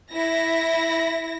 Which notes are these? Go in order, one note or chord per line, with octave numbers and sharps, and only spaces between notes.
E4 A#6